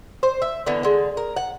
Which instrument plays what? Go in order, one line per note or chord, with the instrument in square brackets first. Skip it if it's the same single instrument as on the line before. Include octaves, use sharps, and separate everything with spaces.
[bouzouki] C5
E5
D3 E3 B3
D3 G#3
A#4
F#5